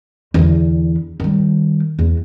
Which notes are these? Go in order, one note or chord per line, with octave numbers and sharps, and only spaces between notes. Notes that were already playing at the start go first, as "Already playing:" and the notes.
E2 D3
D#3 G3
E2